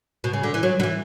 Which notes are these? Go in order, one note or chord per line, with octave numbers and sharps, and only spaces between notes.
B2
C#3
D3
E3
F#3
D3
E3